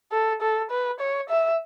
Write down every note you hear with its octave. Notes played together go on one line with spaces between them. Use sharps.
A4
A4
B4
C#5
E5